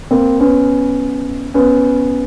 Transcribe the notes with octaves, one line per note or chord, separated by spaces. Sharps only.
A#3 C4
B3 C#4
B3 C#4